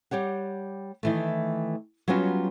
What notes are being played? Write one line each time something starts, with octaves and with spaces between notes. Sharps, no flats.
G3 G4 C#5 F#5
D#3 E3 A3
F#3 G3 B3 C#4 F4 F#4